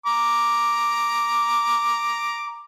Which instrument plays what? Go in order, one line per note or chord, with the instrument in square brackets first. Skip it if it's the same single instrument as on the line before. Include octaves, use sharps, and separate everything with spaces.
[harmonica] A#5 D6